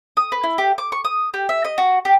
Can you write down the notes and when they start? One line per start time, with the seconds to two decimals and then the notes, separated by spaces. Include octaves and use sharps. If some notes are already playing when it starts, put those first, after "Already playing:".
0.17 D#6
0.32 B4
0.43 E4
0.58 G4
0.78 D6
0.92 C#6
1.05 D#6
1.34 G4
1.49 E5
1.64 D#5
1.78 F#4
2.05 G4